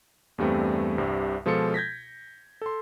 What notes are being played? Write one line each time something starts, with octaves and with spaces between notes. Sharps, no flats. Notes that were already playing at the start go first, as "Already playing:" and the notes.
E2 G2 G3 A3 C4
C2 G2 C3
B2 F3 G#3 F4 A4 C#7
G6 G#6 A#6 B6
A4 C6